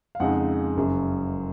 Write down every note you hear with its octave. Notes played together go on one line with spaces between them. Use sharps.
F5
F2 C#3 G#3 D#4 F#5
F#1 F#2 C#3